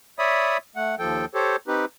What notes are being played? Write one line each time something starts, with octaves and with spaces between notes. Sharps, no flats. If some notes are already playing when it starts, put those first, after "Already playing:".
C#5 D5 E5 B5 D#6
A3 F#5
D#2 F3 A4 G5
G4 A4 C5 C#5
C4 D#4 G4 B4